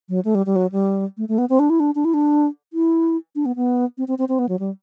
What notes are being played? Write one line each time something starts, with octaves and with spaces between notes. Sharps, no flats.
F#3
A3
G3
G3
F#3
G3
A3
A3
B3
C4
D4
E4
D4
D4
E4
D4
E4
D4
B3
B3
C4
C4
C4
C4
B3
F#3
G3